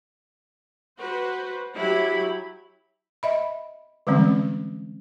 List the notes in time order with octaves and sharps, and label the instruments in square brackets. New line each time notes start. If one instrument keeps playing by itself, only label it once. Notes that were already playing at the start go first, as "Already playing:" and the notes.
[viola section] F#4 B4 C5
F#3 E4 G4 B5
[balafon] D#5 E5 B5
D3 E3 G3 G#3 C4 C#4